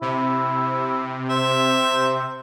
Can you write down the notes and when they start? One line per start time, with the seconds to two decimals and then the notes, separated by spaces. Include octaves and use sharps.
0.01 C3 E4
1.29 C5 E5